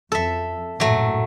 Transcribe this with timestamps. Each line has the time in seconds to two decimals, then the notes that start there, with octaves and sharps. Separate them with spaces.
0.12 F2 A4 E5
0.80 A#1 F#2 A2 F#3 A3